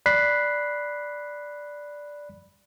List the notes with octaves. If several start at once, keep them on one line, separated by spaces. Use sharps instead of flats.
D5 B5 F#6 B6 C7